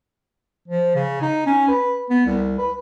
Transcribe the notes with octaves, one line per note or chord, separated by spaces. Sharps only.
F3
C#3
D#4
C#4
B4
B3
C2
B4